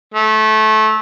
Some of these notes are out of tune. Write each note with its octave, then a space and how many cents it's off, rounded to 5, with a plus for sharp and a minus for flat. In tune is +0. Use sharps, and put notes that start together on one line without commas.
A3 -20